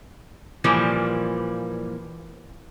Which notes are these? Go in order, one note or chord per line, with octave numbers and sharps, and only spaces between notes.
A#2 E3 F3 G3 A#3